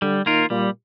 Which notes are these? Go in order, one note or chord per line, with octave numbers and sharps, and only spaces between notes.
D3 G3
D#3 A#3 F4 A#4
A#2 G3